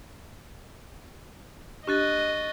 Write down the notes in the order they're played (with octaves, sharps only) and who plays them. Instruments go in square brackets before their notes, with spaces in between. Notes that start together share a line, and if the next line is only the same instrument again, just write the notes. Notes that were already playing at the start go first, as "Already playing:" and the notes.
[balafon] D4 G4 [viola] D#5 [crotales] C#6 F#6 A6